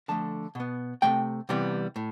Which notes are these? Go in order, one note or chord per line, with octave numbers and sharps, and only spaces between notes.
D3 F3 A3 A5
B2 B3
C3 E3 A3 G5
C3 E3 G3 B3
A2